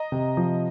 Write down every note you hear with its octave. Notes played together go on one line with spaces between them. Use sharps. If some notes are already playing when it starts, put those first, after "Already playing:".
Already playing: D#5 A#5
C3
F3